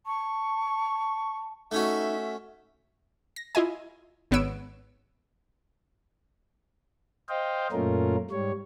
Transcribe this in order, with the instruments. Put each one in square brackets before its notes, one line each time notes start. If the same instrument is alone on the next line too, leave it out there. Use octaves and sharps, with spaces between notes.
[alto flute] A5 [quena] C#6
[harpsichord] A3 C#4 F#4 [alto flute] D#4 [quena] E5
[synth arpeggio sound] A#6
E4 F4 D#5 G#5
G#1 B3 C#5 E6 D7
[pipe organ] C5 D#5 F5 G5
F#2 A#2 A3 C#4 F4 A#4
G#2 G3 C#5